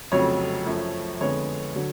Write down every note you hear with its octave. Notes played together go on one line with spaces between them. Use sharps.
F1 F2 C#3 F#3 C#5
F#2 F3 A3
F2 D3 G#3 B3 C#5
D3 F#3